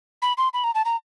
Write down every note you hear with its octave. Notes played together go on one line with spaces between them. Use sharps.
B5
C6
B5
A#5
A5
A#5